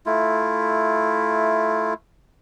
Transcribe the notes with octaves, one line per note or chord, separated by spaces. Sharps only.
A3 E4 F4